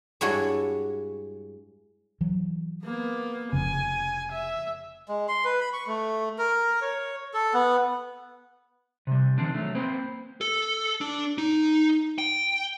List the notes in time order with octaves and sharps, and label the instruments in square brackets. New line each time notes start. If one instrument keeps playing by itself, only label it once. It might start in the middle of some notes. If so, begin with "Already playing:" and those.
[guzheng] G2 G#3 E4 F#4 C#5
[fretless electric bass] E3 F#3
[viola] A#3 B3
[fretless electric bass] F1 F2 C#3 [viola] G#5
[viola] E5
[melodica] G#3
C6
B4
B5
C#6
A3
A#4
C#5
A4
B3
[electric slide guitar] C3 G3
D#3 F3 C4 D4
F#3 A3
A#3 C4 B4 C5
[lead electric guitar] A4
D4
D#4
G5